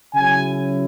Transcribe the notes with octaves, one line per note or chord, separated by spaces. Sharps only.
C#3 F#3 C#4 E4 G#5